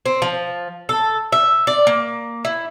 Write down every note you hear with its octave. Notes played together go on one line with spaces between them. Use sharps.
C4
F3
A4
E5
D5
A#3
E4